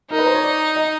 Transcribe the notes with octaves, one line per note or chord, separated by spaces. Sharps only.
D#4 A#4
B4
C5
C#5
D5
D#5